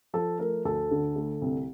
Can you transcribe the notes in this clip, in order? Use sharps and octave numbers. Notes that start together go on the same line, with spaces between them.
F3 A4
A3 A#4
D2 A4
D3
A3
C2